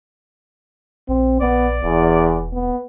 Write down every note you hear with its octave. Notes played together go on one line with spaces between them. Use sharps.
A#1 C4
A#1 B3 D5
E1 E2
B3